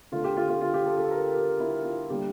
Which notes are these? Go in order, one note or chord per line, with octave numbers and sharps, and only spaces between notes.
D3 A3 F4
G4
F4
F4
F4
G4
A4
A4
A#4
G4
E4
F4
D3 G3 A#3 G4